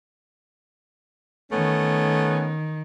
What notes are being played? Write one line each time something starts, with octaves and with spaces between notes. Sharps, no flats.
D#3 A3 B3 C#4